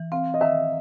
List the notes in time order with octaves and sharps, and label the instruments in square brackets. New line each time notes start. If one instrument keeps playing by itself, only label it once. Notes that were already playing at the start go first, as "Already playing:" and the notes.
Already playing: [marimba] E3
[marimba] C4 [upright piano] F5
[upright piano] D#5
[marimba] D#3 [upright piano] E5